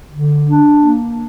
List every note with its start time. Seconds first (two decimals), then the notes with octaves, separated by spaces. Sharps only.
0.12 D3
0.46 D4
0.80 A#3